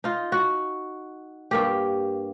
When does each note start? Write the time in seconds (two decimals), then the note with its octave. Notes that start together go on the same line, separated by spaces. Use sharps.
0.04 D#4 F4
0.32 F#4
1.51 G2 A#3 G4